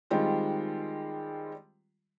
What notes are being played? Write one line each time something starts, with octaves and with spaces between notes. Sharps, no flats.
D#3 G3 G#3 C4 F4